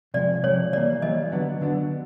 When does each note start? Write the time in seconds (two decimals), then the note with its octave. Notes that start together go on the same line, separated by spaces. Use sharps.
0.14 C3 F3 G#3 D5
0.43 C3 F3 G#3 C#5
0.72 E3 G3 A#3 D5
1.02 E3 G3 A#3 D#5
1.32 D3 F#3 B3 D4
1.61 D3 F#3 B3 D4